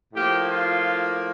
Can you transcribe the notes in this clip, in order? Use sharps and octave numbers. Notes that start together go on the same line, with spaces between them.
A2 F3 A#3 G4
F4